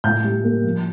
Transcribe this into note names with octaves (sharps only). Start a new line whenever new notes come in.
A2 G6
G3
A#3
F3